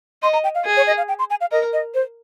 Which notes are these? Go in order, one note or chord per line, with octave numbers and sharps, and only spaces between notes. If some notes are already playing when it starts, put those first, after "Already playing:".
D#5 C6
A#5
G5
F5
G#4
C#5
D#5
F5
G5
C6
G#5
F5
A#4 D#5
D#5
C5